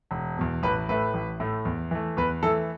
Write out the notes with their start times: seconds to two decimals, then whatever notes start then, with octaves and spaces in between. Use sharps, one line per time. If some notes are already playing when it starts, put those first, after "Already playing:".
0.11 E1
0.38 E2 B2
0.63 A1 B4
0.89 A2 A3 B4
1.14 A1
1.40 A2 A3
1.65 E2
1.91 E3 A3
2.17 E2 B4
2.43 E3 A4
2.46 A3